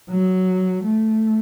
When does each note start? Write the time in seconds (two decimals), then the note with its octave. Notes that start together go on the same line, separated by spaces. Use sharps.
0.10 F#3
0.84 A3